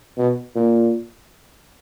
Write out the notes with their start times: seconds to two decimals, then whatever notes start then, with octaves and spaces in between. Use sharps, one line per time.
0.18 B2
0.55 A#2